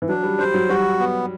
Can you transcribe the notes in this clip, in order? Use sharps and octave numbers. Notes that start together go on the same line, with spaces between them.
E3
F#3 D4
G3
G3 C5
F#3
G3 F#4
B3